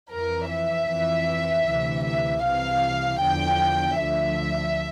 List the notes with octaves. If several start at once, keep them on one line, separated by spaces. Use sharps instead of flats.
F2 E3 A#4
E5
F2 E3
D2 C3 E3
E5
C2 C3 E3 F5
E2 D3 F3 G5
D2 D3 F3 E5